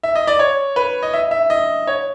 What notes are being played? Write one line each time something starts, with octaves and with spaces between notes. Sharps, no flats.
E5
D#5
D5
C#5
B4
D#5
E5
E5
D#5
C#5